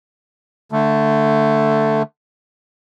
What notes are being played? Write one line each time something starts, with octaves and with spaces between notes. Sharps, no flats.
D3 A3